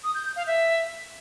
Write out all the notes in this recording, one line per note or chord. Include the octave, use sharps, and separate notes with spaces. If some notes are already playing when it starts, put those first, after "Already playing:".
D#6
G6
G6
F5
E5